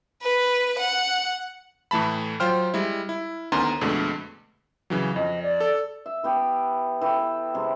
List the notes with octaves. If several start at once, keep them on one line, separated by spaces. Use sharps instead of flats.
B4
F#5
A2 E3 A3 A5 B5
F#3 F4 C5 G5 F6
G3 G#3 E4
E4
D2 D#3 B3 C#4 A#5 C6
F2 B2 D3 G#3 A3
C#3 E3 F#3
F2 D#5
D5
A4
E5
E3 B3 G4
E3 G4 A4
C3 G#3